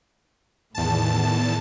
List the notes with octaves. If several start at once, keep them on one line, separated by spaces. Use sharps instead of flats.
E2 A2 D#3 A5